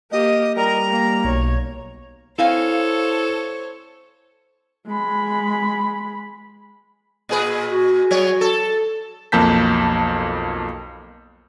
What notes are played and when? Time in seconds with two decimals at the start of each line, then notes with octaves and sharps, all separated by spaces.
0.12 A#3 G4 D#5
0.56 G3 A#4 D#5 A#5
0.89 A#3
1.25 B1 C#5
2.39 C4 E4 A4 C5 C#5 F5 G#5
4.88 G#3 B5
7.29 A#2 G#4 B4
7.71 F#4
8.11 F#3 B3 C#5
8.41 A4
9.32 B1 F2 A#3 A5 G6 B6